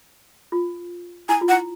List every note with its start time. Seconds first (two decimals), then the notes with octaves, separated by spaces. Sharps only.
0.52 F4
1.29 E4 G#5
1.41 F4
1.49 F#5
1.52 E4